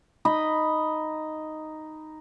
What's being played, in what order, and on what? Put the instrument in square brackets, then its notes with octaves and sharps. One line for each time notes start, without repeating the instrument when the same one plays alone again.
[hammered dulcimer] D#4 D#5 B5